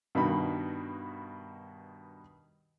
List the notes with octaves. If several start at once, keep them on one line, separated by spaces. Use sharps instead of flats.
G2 B2 D#3 F#4 B5